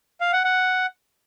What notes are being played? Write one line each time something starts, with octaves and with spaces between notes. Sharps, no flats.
F5
F#5
F#5